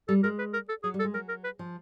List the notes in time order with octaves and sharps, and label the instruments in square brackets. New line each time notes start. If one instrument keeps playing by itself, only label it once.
[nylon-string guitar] G3 [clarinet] A4
[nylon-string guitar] G#3 [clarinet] A#4
[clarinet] B4
A#4
A4
[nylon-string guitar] F#3 [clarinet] G#4
[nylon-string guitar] G3
[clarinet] A4
[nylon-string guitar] G#3
[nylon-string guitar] F#3 [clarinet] A#4
[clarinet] A#4
B4
[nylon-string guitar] F3